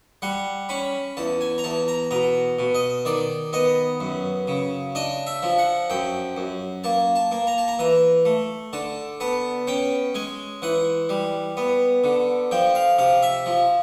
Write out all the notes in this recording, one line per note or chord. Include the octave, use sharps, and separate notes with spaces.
G3 F#5
C#4 B5
E2 A5
G#5
A#5
E2 A5
A#5
B2 A#5
B2
D#5
D#3 D5
B3 D#5
F#2
C#3
D4 D#5
E5
F3
F#5
F#2 G5
F#2
A#3 A5
A5
A#3
A#5
A5
A#5
E3 A#5
A3
D3 A5
B3 A5
C#4 G5
G#3 G#5
E3 F#5
G3
B3
D3
F3 G5
F5
C3 F5
E5
F3